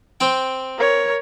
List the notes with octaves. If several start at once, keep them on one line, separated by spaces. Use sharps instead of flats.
C4 G5
A#4 C#5